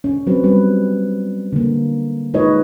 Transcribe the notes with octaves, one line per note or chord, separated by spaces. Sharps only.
C#4
F#3 C4 B4
G3 B3 B4
D3 A#3
G#3 D#4 F4 B4 C#5 D#5